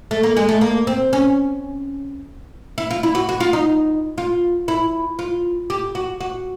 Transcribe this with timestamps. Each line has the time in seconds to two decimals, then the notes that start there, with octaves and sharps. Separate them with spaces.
0.11 A3
0.23 A#3
0.37 G#3
0.49 A3
0.61 A#3
0.87 C4
1.13 C#4
2.78 E4
2.90 F4
3.03 E4
3.15 F#4
3.29 F#4
3.40 F4
3.53 D#4
4.18 F4
4.68 E4
5.19 F4
5.70 G4
5.95 F#4
6.21 F#4